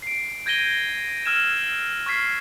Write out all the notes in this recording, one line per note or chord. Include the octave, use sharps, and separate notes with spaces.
C7 D7
G6 G#6 A#6 D#7 G7
E6 F6 G#6 E7
C#6 F6 G#6 B6 C7